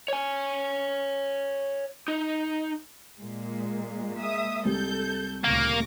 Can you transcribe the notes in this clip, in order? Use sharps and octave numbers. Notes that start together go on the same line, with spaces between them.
C#5 G#5
D#4
A#2 G#3 A#3
E5 D#6
C2 A4 G6
D2 A#2 C#3 A#3 C#6 D6 A#6